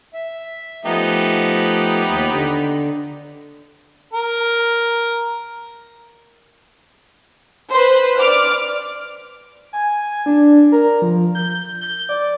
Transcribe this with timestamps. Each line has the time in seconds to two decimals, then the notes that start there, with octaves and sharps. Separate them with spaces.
0.14 E5
0.85 F3 A3 B3 D#4 G4
2.08 D#2
2.31 D3
4.13 A#4
7.71 B4 C5
8.19 D5 D6 F6
9.73 G#5
10.26 D4
10.72 A#4
11.02 F3
11.35 G6
11.81 G6
12.09 D5